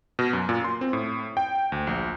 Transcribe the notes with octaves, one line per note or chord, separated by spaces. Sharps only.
B2
F#2
A#2
C6
C4
A2
G5
D2
A#1